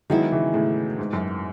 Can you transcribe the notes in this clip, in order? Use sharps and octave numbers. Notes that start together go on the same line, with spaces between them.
D#3 F#3 G#3 B3 E4
C#3 E3
A2 C#3
G#2
F#2